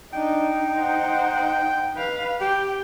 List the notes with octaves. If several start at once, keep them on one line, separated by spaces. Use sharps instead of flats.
D4 D#4 G5
C5 F#5
B4 F5
G4 G5